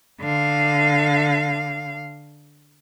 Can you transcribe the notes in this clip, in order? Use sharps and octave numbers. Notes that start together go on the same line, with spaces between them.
D3 F5